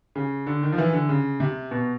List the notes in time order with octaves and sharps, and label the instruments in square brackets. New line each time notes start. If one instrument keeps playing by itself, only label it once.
[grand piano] C#3
D3
D#3
F3
E3
D3
C#3
C3
B2